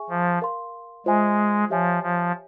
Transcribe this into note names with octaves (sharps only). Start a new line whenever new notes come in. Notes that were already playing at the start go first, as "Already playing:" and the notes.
Already playing: G#4 E5 G#5 C#6
F3
A#4 F5 C6
G#3 F4 C5 E5 G#5
F3 G4 C#5 E5 G#5
F3